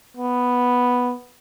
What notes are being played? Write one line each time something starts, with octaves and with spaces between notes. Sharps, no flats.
B3